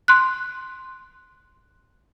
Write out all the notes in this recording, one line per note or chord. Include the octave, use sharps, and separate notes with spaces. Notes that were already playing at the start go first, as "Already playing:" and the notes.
C6 F#6